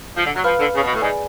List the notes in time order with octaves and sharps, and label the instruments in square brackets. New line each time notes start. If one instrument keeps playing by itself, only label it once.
[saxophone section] F3
D3
F#3
[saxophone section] F3 [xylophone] B4 F5 B5 F6
[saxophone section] D3
C#3
B2
A2
[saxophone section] G#2 [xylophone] G#4 D5 G#5 B5